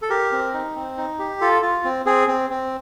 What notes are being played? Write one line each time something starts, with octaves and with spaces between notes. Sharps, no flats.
A4
G4 A#4
C4
D#4
C4
D#4
G4
F4 A4
F4
C4
C4 G#4
C4
C4